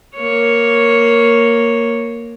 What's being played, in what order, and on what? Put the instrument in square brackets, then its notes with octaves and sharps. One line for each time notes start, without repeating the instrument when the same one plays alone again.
[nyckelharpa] A#3 C#5